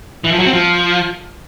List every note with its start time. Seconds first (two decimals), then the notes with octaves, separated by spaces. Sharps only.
0.24 E3
0.31 F3
0.39 F#3
0.46 C4
0.53 F3